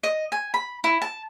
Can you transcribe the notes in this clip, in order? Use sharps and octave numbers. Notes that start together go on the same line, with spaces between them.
D#5
G#5
B5
E4
A5